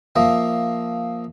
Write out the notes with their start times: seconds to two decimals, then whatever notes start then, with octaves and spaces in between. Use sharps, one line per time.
0.16 F3 A#3 D#5 E5